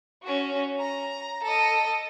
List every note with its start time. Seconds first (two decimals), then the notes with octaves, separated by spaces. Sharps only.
0.23 C#4 F#4
0.79 A#5
1.43 A4 D#5